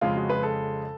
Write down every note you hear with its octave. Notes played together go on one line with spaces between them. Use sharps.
F2 C#3 G#3 F4
F#4
B4
A4